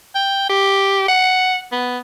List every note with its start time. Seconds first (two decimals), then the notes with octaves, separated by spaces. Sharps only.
0.15 G5
0.50 G4
1.08 F#5
1.72 B3